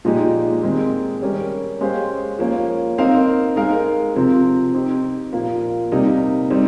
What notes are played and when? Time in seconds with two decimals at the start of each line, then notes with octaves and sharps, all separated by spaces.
0.05 A#2 F3 G#3 D#4 G4
0.63 D#3 G#3 C4
1.22 G3 C#4 G4 A#4
1.81 G#3 C#4 G4 C5 F5
2.39 F3 A#3 C#4
2.98 C4 D#4 A#4 F5
3.56 G#3 D#4 A#4 F5
4.16 C3 F3 C4
4.74 C4 D#4 G4
5.33 A#2 F3 A#3
5.92 C3 G3 A#3 D#4
6.50 G3 C4 D#4